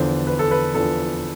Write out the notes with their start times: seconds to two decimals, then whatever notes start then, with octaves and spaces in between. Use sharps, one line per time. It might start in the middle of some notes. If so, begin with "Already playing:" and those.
Already playing: E2 D3 F3 C5
0.27 B4
0.39 A4
0.51 B4
0.75 E2 D3 F3 A4